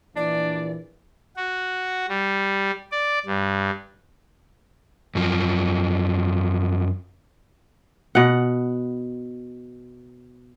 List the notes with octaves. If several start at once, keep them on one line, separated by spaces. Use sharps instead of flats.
A#1 E3 D4 D5
F#4
G3
D5
G2
F#2 F3
B2 F#5